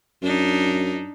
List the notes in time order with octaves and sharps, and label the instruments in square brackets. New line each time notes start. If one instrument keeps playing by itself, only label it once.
[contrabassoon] F#2 [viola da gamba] D4 D#4